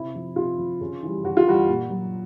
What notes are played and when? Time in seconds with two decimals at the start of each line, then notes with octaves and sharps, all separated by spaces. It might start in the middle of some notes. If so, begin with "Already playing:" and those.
Already playing: C3 E4
0.15 F3
0.36 C3 F4
0.58 F3
0.81 C#3
1.03 E3 G3
1.24 C#3 F#4
1.37 F4
1.47 E3 G3 F#4
1.69 A#2
1.90 F#3